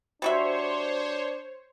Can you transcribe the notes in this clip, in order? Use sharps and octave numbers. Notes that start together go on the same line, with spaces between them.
G3 D4 F#4 C5 C#5 E5